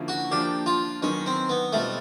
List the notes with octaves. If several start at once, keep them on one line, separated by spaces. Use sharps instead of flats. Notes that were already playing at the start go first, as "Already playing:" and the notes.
Already playing: D3 F3 A#3 C#4 E4
F#4
F3 A#3 D4 F4 G4
F4
D#3 F#3 B3 C#4 D#4
C4
B3
B2 G3 A3 C4 F4